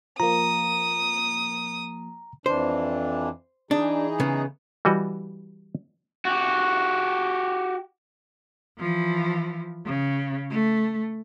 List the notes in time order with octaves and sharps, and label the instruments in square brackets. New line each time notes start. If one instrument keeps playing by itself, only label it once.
[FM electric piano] F3 A#3 [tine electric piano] A#5 [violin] D#6
[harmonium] F2 E3 D4 [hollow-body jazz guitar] C5
[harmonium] E3 D#4 G#4 [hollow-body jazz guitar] D4
[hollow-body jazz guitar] C#3 B3
[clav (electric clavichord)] E3 G3 F#4 D#5
[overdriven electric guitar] F#4 G4
[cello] E3 F3
C#3
A3